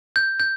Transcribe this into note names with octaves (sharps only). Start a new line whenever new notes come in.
G6
G6